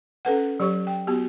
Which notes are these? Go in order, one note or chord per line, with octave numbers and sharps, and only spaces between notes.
C#4 A4 B4 F#5
F#3 G4 C#5 C#6
G5
B3 F#4 G4